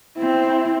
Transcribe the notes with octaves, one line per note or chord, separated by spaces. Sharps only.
C4 E4